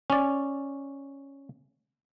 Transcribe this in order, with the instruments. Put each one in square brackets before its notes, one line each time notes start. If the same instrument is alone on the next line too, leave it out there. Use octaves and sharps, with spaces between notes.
[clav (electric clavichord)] C#4 D5